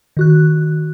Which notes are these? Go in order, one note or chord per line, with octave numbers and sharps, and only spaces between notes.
D#3 F#4 F#6